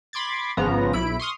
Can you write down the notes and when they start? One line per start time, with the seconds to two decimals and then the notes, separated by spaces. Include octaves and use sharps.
0.13 B5 C6 D6 G#6 A6
0.57 G#1 C#3 F3 B3 A#5
0.93 B1 E4 B5 D7
1.19 C6 C#6 D#6 F6